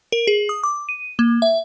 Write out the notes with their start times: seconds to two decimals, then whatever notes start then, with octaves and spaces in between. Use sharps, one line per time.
0.12 A#4
0.27 G#4
0.49 D#6
0.64 D6
0.89 D#7
1.19 A#3
1.42 E5